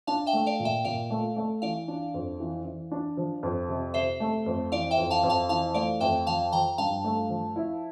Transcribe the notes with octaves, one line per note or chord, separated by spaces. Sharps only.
D4 F5 A5
E5 G5
A3
D5 F5
A#2
E5 G5
A#2 D5 F5
A3
A3
E3 D5 F5
D4
F2
E3
E3
D4
F3
F2
C3
C3 C5 E5
A3
F2
E3 D5 F5
E5 G5
F2
F5 A5
F2
F5 A5
E3 F5 A5
A3 D5 F5
F2 E5 G5
F3 F5 A5
F3 G5 A#5
G2 F5 A5
A3
F3
E4